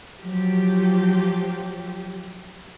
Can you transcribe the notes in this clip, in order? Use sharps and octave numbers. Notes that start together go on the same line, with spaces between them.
F3 F#3 G4